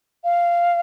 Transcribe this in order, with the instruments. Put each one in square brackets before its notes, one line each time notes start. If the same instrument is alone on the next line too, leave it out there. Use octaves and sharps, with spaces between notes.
[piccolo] F5